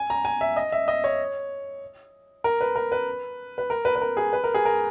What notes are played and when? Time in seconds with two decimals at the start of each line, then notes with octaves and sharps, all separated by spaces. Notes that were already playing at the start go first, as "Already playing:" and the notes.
Already playing: G#5
0.10 A#5
0.25 G#5
0.41 E5
0.56 D#5
0.72 E5
0.88 D#5
1.04 C#5
2.44 A#4
2.61 B4
2.76 A#4
2.92 B4
3.58 B4
3.70 A#4
3.85 B4
3.95 B4
4.02 A#4
4.17 G#4
4.33 B4
4.44 A#4
4.54 G#4
4.65 A#4